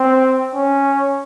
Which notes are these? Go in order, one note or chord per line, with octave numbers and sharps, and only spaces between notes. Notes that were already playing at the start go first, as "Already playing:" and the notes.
Already playing: C4
C#4